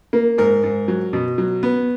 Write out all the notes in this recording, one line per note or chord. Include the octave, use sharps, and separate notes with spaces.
A#3
G#2 A#4
G#2
F#3
B2
F#3
B3